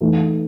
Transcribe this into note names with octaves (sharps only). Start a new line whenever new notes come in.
E3 A3 D#4